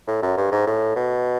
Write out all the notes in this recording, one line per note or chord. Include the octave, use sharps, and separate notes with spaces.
A2
F#2
G2
G#2
A2
B2